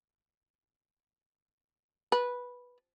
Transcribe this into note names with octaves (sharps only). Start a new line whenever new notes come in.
B4